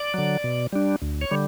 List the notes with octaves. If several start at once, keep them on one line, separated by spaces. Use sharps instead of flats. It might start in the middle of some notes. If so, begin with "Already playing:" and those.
Already playing: D5
D3 F#3
B2
G3 D4
D2
C#5
D3 G3